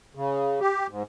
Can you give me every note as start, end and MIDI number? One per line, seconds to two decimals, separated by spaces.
0.15 0.60 49
0.60 0.87 67
0.90 1.03 44